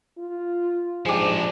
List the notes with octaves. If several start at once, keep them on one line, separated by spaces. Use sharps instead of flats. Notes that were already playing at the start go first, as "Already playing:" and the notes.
F4
G#2 F3 D4 G4 G#4